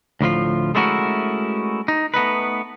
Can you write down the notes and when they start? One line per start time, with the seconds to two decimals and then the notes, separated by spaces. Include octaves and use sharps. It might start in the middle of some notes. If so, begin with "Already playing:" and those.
0.21 D2 A2 F3 F4
0.75 G#3 A3 C#4 E4 F#4 A#4
1.88 D#4
2.14 A3 B3 D#4 B4